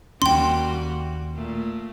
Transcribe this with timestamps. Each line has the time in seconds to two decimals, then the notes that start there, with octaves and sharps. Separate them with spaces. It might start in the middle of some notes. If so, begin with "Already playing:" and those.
0.22 D#2 G3 A#3 C#4 F#4 G5 C6
1.34 A#2 A3